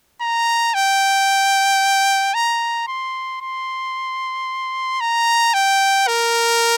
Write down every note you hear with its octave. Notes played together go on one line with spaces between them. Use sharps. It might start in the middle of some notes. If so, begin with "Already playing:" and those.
A#5
G5
A#5
C6
C6
A#5
G5
A#4